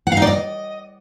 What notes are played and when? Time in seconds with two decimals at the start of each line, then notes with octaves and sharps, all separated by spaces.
0.07 F#5
0.12 F5
0.17 D#4
0.22 D5
0.27 D#5